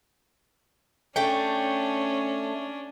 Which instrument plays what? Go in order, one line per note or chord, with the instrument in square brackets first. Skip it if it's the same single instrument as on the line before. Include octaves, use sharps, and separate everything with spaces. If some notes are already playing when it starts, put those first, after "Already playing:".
[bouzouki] A3 G5 [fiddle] C#4 D4